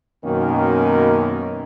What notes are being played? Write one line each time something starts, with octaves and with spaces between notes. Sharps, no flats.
F#2 B2 D#3 A#3 C#4